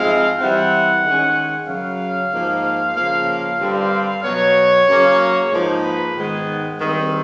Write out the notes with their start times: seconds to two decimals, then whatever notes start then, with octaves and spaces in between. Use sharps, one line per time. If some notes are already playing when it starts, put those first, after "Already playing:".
Already playing: G#2 F3 G#3 C4 E4 F5
0.40 E3 G3 C4 E4 F#5
1.04 D#3 G#3 C#4
1.67 F#2 C#3 F#3 F5
2.32 G#2 F3 A#3 D#4
2.96 C#3 F3 A#3 F5
3.28 F5
3.60 G2 D3 G3 C4
4.24 B2 F#3 B3 C#5
4.88 F#2 C#3 F#3 A#3 C#4
5.52 G#2 F3 A#3 D#4
5.84 B4
6.16 G#2 D#3 G#3 B3
6.80 G2 D#3 G#3 C4